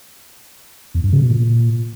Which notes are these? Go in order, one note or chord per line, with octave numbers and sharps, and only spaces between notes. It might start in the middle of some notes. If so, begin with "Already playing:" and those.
E2
G2
C#3
B2
A#2